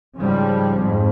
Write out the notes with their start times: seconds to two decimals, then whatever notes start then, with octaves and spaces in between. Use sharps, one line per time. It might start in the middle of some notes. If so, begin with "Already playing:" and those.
0.17 G#2 C#3 F3 G3
0.78 F2 G#2